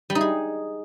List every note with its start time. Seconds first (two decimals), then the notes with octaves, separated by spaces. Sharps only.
0.10 G3
0.15 D#4
0.21 G#4